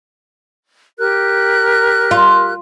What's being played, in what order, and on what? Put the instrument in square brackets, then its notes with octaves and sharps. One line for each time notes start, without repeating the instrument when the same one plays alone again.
[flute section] G4 A#4 F#6
[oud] F4